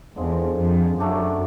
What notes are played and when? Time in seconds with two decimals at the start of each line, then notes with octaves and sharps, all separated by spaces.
0.16 E2 D3 F3 G#3 C4
0.58 F2
0.99 F#2 F#3 A3 D4 G4